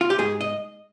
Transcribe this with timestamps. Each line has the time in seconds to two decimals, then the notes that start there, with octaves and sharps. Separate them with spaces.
0.01 F4
0.10 G4
0.18 G#2 G#4
0.41 D#5